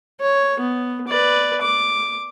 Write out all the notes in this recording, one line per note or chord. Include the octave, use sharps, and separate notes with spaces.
C#5
B3
B4 D5
D6